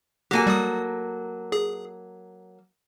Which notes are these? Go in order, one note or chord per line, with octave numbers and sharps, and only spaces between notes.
F#3 A#3 G4 A4 G#5
G3 D#6
G#4